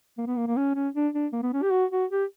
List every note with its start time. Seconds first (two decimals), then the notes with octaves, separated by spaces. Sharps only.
0.18 A#3
0.26 B3
0.36 A#3
0.47 A#3
0.57 C#4
0.75 C#4
0.95 D4
1.13 D4
1.33 A#3
1.43 B3
1.53 C#4
1.62 G4
1.72 F#4
1.91 F#4
2.11 G4